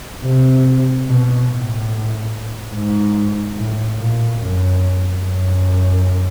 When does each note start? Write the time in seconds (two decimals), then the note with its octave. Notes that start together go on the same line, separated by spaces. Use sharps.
0.23 C3
1.06 B2
1.49 A2
2.73 G#2
3.57 A2
3.98 A#2
4.39 F#2
5.22 F#2